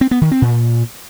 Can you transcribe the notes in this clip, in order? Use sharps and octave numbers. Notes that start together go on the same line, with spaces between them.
C4
B3
D#3
C4
A#2